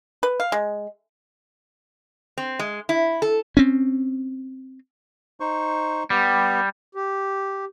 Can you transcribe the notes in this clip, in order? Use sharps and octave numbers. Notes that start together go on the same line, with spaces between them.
B4
F5
G#3
C4
G#3
E4
A4
C4 C#4
D#4 C5 C#6
G3 B3 G4
G4